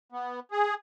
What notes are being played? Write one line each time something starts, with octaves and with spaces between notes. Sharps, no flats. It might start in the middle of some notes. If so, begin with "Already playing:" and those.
B3
G#4